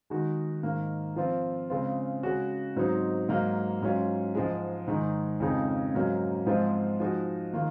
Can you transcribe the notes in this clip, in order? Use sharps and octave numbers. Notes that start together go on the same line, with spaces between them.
D#3 G#3 D#4 F#4
G#2 D#3 A#3
F3 C4 F4
C#3 G#3 C4 F4
C#3 G#3 C#4 F#4
G#2 F#3 C4 D#4
G#2 F#3 A#3
G#2 F#3 C#4 F4
G#2 F3 G#3
G#2 D#3 G#3 D#4
F2 C#3 F3 G#3 D#4
G#2 F#3 A#3 C#4
G#2 F3 G#3 C4 F4
F3 G#3 D#4 F#4
D#3 A#3 F4